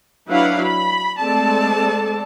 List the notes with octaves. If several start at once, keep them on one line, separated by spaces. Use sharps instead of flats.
F#3 D4 E4 B4 F5 F#5
B5
G#3 A3 C4 A4 D5 A5